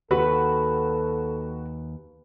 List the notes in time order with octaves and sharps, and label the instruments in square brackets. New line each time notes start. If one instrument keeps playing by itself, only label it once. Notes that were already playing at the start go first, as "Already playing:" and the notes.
[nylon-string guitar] D#2 [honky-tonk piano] F#4 [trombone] A4 [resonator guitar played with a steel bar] B4